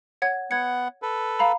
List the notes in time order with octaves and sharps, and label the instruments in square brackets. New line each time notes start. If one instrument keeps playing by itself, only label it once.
[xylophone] C#5 F#5 G#6
[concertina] B3 F#5 [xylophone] G#6 C#7
[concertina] A4 B4
[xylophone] F5 A#5 B5